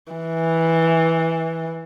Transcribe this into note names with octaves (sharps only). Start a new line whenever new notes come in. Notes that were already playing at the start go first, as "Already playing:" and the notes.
E3